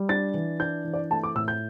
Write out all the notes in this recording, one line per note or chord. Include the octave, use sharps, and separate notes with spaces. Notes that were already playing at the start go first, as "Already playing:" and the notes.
Already playing: G3
D4 A6
E3
D4 G6
E3
D5
A3 A5
D6
A2 E6
G6